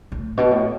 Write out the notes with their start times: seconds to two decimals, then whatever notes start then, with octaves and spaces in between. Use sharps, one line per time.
0.12 A2
0.37 B2
0.51 A2